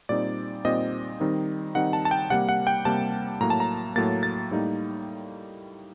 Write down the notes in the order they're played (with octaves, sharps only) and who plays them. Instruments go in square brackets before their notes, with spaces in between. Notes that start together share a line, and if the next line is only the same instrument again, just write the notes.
[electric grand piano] A#2 G3 C4 D#4 D5
A#2 G3 C4 D#4 D#5
D#3 G3 C4 D#4
D#3 G3 C4 D#4 F#5
A5
A5
G5
C3 G3 A#3 F#5
F#5
G5
C3 G3 A#3 A5
A2 F#3 A#3 A#5
A5
A#5
A2 F#3 A#3 A6
A6
A2 G3 A#3 D#4